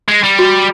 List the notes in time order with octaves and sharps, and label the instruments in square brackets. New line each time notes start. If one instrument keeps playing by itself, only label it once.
[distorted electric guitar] G#3
G3
[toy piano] F#4